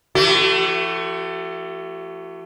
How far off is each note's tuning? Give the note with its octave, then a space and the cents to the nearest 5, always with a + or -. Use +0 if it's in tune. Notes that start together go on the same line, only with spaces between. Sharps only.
F3 -40 A3 +25 G4 -45